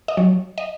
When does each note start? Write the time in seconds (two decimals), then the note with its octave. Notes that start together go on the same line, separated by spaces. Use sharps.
0.08 D#5
0.17 F#3 C#5
0.58 D#5